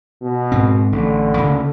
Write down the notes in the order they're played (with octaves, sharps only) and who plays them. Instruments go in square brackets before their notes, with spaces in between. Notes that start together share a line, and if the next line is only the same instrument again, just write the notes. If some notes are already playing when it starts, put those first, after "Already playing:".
[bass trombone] B2
[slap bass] G#2 C4
[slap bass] A1 [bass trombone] D3
[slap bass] D2 C#3 A#3